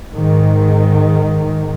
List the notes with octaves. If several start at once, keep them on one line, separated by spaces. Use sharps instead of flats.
G#2 D#3